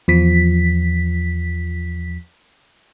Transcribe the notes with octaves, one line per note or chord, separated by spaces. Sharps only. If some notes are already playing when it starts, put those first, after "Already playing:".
E2 F3 B6